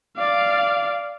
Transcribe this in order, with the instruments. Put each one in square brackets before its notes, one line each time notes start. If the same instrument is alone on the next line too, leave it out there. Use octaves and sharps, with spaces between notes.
[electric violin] D5 F5